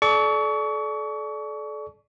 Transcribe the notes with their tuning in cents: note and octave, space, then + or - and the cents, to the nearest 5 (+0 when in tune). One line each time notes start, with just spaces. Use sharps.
A4 -35 D5 +0 C#6 +30